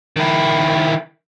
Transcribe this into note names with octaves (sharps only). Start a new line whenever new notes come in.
D#3 E4